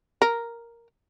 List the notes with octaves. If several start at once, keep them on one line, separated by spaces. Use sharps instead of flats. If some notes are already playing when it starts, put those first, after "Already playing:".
A#4